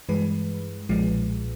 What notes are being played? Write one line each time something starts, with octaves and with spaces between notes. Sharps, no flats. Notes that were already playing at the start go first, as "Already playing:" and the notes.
G2 E3 G#3 B4
B1 A#2 F3 G#3